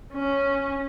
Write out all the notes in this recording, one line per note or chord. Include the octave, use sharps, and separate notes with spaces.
C#4